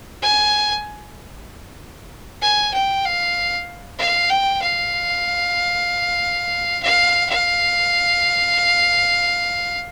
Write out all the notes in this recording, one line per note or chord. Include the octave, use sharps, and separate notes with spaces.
G#5
G#5
G5
F5
F5
G5
F5
F5
F5